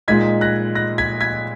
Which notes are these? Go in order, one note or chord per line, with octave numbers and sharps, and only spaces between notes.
A#2 G#3 D#4 G#6 B6
F#6 A#6
F#6 A#6
G#6 B6
G#6 B6